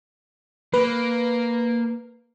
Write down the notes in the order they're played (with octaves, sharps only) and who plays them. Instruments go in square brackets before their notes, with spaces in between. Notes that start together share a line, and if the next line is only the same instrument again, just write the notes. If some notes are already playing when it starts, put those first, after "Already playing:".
[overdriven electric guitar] A#3 [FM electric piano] B4